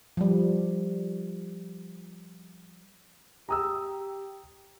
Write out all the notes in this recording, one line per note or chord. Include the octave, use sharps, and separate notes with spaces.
F3 G3
G4 A#5 D#6 E6